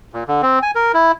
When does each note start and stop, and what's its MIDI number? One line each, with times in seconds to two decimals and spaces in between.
0.13 0.23 46
0.28 0.42 50
0.43 0.59 60
0.62 0.71 80
0.75 0.92 70
0.94 1.12 64